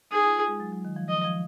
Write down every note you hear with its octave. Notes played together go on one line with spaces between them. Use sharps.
D#4 G#4
F4
F4
G#3
F#3
F#3
D#3
F3
F3 D#5
F3